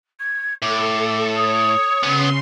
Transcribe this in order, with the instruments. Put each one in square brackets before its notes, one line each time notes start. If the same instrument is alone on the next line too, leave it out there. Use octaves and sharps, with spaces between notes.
[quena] G#6
[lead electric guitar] A2 [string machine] A4 [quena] D6
[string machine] C#5 [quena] D#6
[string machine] C#3 C6 [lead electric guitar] B3 C#4